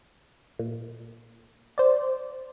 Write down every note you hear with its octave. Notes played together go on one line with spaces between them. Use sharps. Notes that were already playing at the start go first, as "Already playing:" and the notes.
A#2
C5 D5